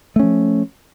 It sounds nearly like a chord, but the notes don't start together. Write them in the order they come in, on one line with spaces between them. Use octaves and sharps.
A3 C#4 F3